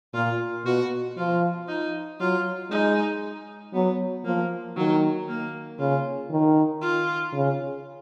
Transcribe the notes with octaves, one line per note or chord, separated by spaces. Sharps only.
A#2 F4
B2 F#4
F3 F4
D#4
F#3 F4
G#3 D#4
F#3 B3
F3 A#3
D#3 F#3
A#3
C#3 F4
D#3
F4
C#3